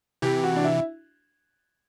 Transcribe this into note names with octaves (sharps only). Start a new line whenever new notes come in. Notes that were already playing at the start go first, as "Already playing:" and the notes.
C3 E3 G4
F#4
D4
E4